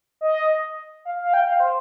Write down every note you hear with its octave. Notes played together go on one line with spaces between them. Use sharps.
D#5
F5
F5
G5
F5
C5